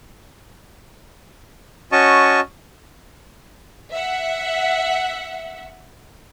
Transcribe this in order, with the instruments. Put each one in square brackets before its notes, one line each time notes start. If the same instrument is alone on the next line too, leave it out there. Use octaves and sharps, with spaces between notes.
[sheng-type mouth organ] C#4 F#4 D#5 A5 C#6
[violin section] E5 F#5